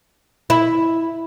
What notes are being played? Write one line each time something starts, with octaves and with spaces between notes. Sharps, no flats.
E4